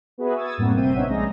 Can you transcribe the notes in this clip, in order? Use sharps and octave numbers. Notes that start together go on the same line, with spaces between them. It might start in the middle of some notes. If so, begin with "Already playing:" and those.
B3 F#4 G#4 B4 E5
C#6 D#6 E6 G#6 A6
F#2 A2 G3 A#3 C4 F#4
A1 C3 C4 E5 G6 D#7
B3 C#4 D#4 C#5 E5 F#5
A#1 G3 G#3 D#4 G#4 A#6